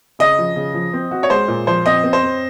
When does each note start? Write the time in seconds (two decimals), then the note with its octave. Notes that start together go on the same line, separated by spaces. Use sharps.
0.19 C#3 D#5
0.39 F3
0.56 C#3
0.74 F3
0.93 C4
1.11 F#4
1.23 C#5
1.30 G#3 C5
1.48 A#2
1.67 F3 C5
1.86 C4 D#5
2.04 C4
2.13 C5
2.23 C4